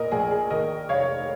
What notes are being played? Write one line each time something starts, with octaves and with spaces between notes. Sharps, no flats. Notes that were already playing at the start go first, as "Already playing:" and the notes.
Already playing: F1 A#2 A#4 D#5
A#1 G#4
G#4
D#2 A#4 D#5
F1 C#5 F5